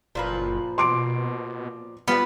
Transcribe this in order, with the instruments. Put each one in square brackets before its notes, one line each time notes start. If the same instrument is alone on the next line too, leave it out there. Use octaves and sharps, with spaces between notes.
[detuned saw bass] F#1 [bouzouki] A#2 F3 B4
[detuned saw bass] B2 [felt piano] C6 D6 D7
[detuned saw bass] G3 [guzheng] B3 [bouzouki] F4 F#5